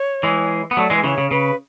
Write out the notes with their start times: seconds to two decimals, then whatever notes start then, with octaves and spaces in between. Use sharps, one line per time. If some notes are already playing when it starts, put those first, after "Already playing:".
Already playing: C#5
0.23 E3 G#3
0.71 B3
0.77 F#3 A3 D5
0.90 E3 G#3
0.95 B4
1.04 C#3 E3 C#5
1.18 C#3
1.31 C#3 B4